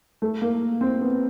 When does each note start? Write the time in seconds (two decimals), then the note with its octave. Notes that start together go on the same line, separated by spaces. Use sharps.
0.22 A3
0.42 A#3
0.81 C4
1.01 B3